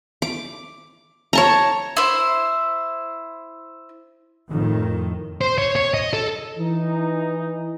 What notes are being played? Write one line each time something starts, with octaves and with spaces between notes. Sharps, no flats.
D6
C#5 A5 A#5
E4 C5
F2 A2 D#3
C5
C#5
C#5
D#5
A4
E3 D#4